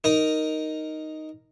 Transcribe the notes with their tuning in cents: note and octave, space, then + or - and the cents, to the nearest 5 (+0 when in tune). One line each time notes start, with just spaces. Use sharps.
D#4 +0 A#4 +0